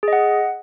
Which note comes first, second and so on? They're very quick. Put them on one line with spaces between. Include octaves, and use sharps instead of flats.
G#4 D#5 F#5